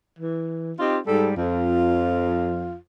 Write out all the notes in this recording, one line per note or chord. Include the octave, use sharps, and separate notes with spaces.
E3
C4 D#4 F4 G4
G#2 G3 A4
F2 F4